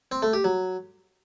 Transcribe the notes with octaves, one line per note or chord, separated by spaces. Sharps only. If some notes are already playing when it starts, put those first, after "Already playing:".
C4
A3
G4
F#3